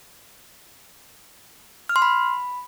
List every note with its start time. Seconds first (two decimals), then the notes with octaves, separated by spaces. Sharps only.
1.89 F6
1.96 C6
2.02 B5